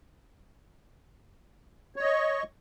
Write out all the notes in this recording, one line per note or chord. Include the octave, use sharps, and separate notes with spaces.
C#5 D#5 C#6